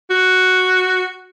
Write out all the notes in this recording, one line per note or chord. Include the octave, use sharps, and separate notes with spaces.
F#4